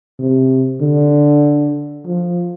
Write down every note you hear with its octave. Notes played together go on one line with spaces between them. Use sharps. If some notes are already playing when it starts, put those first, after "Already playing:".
C3
D3
F3